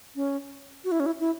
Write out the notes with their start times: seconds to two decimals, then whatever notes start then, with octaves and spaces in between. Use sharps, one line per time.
0.16 C#4
0.84 F#4
0.91 E4
1.00 C#4
1.06 E4
1.20 E4